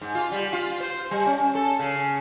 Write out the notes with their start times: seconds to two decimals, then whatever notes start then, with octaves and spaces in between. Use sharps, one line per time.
0.01 G#2
0.15 F4
0.32 G3
0.53 F4
0.80 C5
1.11 G3
1.26 C#4
1.55 A4
1.79 C#3